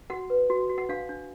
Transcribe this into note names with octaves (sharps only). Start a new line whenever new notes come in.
F#4 F#5
B4
F#4
F#4
F#5
D4 F5
D4